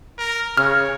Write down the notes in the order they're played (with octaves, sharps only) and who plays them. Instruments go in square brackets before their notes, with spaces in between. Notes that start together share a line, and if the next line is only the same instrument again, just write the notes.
[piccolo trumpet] A#4
[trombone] C#3 [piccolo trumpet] C#5 [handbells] F6